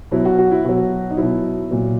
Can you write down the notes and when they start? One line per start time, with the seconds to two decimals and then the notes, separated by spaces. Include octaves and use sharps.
0.11 B2 F#3 E4
0.25 F#4
0.38 F#4
0.51 E4
0.65 B2 F#3 F#4
1.11 D#4
1.17 B2 F#3 E4
1.71 A#2 F#3